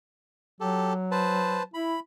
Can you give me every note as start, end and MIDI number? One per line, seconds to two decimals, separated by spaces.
0.61 1.65 54
0.61 0.93 67
0.61 0.93 69
1.11 1.63 71
1.11 1.63 72
1.11 1.63 81
1.74 1.96 64
1.74 2.00 83